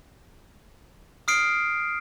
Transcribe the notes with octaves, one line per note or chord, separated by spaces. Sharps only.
D#6 F6 C7 D7